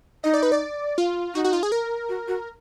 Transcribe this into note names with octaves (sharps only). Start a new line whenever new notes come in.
D#4 D#5
D5
B4
D5
F4
D#4 F#4
F#4
F4
G#4
A#4
F#4
F#4